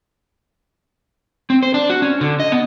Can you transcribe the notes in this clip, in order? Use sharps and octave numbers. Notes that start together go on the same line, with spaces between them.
C4
C5
D4
F#4
C#4
D3
D#5
B3